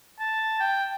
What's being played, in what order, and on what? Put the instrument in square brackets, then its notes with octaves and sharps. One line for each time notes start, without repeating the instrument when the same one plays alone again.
[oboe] A5
G5